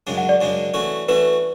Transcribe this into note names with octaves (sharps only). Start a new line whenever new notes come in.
F#2 C#3 G#3 D4
F#5
D5
F#2 C#3 G#3 D4
E3 A3 C#4 F#4
E3 A3 C#4 F#4 B4